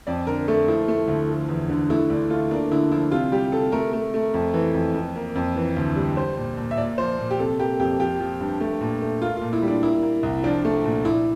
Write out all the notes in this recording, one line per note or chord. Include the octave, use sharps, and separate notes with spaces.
F2 D5
D3 A#4
A3 A4
F3 E4
A3
D2
F3
E2
D3
A3 E4
D2 D4
A3 F4
A#3 D4
D3 E4
F3 E4
C3 F4
G3 G4
C3 A4
A3 A#4
A3
A3
F2
E3
F2
F2
A#3
F2
E3
D2
G3
G3 C5
A#2
A#2
E5
A#2 D5
F3 C5
A#2
G4
C3 A4
A#3 G4
F2 G4
F3 G4
F3
G2
A3
A#2
A3
A#3 F4
A#2 F4
E4
G3
D4
A#3 E4
A#3
C2
F3 D4
A3
A#2
A#2 E4